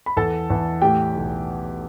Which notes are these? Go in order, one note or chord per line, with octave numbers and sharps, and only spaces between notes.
B5
E2 A4 A5
E2
A2 G4 G5
B1